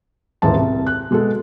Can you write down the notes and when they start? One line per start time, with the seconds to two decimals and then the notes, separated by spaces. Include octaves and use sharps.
0.42 D#1 G#2 E3 A5
0.56 C2
0.87 F#6
1.11 B2 G#3 F#4 A4